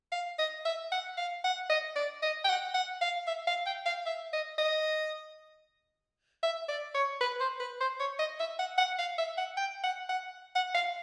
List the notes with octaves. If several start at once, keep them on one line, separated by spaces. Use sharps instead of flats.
F5
D#5
E5
F#5
F5
F#5
D#5
D5
D#5
G5
F#5
F#5
F5
E5
F5
G5
F5
E5
D#5
D#5
E5
D5
C#5
B4
C5
B4
C5
C#5
D#5
E5
F#5
F#5
F5
E5
F#5
G5
F#5
F#5
F#5
F5